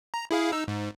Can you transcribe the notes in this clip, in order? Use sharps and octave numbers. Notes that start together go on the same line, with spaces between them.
A#5
E4 G#4 F5
D#4 E6
G#2